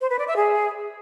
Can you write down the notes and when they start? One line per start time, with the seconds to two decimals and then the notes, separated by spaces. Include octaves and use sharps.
0.01 C5
0.10 B4
0.19 D5
0.28 E5
0.36 G#4